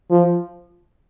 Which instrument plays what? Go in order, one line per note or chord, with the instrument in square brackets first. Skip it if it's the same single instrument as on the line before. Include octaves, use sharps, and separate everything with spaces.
[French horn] F3